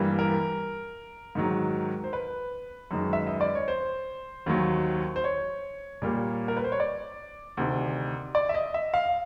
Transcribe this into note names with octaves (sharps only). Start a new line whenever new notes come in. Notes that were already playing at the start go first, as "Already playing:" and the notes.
Already playing: G2 E3 G3 A#3
A#4
G#2 D#3 F#3
C5
B4
F#2 D#3 G#3
E5
D#5
D5
C#5
C5
D#2 D#3 F#3
C5
C#5
A#2 G3 A#3
A#4
B4
C5
C#5
D5
D2 C3 D#3
D5
E5
D#5
E5
F5